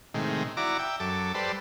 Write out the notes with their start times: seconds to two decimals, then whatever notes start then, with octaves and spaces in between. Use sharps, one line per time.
0.14 A2 C3 D#3 G#3
0.57 E4 F#4 D5 A#5 D6
0.79 E5 G5
1.00 F#2 A4 D6
1.35 G3 A4 B4 C5 D5